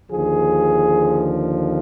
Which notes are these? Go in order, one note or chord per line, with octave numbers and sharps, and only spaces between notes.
D#2 D3 F3 G#4